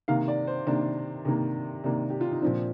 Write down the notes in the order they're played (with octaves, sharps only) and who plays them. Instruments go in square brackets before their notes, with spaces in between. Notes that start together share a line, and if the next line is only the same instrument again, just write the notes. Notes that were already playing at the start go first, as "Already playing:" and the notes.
[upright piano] C3 D#3 A#3 F5
D5
C5
C3 D#3 A#3 D4
C3 D#3 A#3
C3 D#3 A#3 D4
G4
F4
D#4
A#2 F3 C4 D4